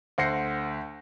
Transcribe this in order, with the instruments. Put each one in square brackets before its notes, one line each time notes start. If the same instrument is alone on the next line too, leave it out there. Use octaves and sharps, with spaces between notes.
[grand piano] D2 C5 F#5 A#6 C7 C#7